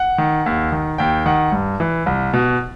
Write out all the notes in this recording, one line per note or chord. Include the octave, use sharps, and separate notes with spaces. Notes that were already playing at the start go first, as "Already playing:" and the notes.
Already playing: F#5
D#3
D#2
D#3
D#2 G5
D#3 F#5
G2
E3
C2
B2